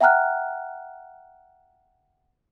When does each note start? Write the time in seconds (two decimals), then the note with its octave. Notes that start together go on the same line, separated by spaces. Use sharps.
0.01 E5 F#5 G5 A#5 F6 F#6